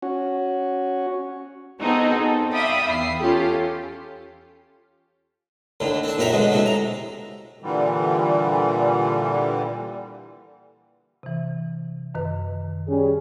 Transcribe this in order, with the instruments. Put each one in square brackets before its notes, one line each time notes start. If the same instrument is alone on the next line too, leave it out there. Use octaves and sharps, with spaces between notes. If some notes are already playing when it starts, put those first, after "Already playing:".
[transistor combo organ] C#4 F#4
[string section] B3 C4 D#4 F#4 G#4 A4
A4
D5 E5 F5 G5 B5 D#6
E2 C7
C#4 F4 G4 A4
[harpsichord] D#2 A2 D3
C4 D4
A#1 F#2 A3 D4 G4 A#5
B2 D3 F#3 G#3
A2 C3 G#3 A3
A#5
[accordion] A#2 D3 E3 G3
[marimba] C3 E3
F#2 D#3 B4
[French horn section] G3 C#4 G#4